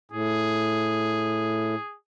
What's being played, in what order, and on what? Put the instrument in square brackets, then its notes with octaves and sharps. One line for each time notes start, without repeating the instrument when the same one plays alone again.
[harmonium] A2 [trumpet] G#4